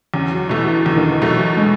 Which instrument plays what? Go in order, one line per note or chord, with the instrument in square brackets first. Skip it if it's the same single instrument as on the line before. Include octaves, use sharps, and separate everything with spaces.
[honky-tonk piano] E2 [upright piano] C#4
[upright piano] F#3
[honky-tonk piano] B2 A3 [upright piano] E3
[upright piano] E3
[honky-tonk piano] E2 [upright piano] E3
[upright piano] D#3
E3
[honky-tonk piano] B2 A3 [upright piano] F#3
[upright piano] G#3